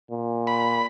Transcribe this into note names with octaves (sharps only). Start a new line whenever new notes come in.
A#2
B5